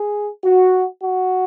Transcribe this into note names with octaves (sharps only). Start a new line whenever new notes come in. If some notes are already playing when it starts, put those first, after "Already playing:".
Already playing: G#4
F#4
F#4